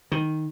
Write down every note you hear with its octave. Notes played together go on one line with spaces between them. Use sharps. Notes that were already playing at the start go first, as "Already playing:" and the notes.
D#3